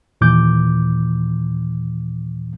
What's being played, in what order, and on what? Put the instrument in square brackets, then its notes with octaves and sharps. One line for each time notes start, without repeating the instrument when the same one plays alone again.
[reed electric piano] D#2 A#2 E3 D6 G6